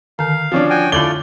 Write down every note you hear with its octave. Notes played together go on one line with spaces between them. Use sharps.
D3 D#3 F5
F3 C#4 D4
F#4 G5 G#5
D3 A3 E4 F4 C#5 D5 F#7 G7